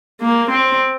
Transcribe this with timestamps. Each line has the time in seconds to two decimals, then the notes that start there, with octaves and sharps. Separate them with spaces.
0.21 A#3
0.51 C4